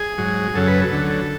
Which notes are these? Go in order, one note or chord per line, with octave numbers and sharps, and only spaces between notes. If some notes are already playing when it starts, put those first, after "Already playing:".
Already playing: G#4
G#2 F#3
F#2 C#3 F#3 A4
B4
A4
D2 D3 F#3